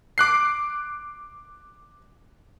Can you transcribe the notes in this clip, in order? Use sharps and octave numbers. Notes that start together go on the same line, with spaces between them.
D6 F#6 C7